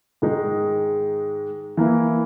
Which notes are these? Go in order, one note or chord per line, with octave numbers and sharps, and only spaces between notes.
G#2 D#3 G#3 D#4 G#4
E3 A#3 E4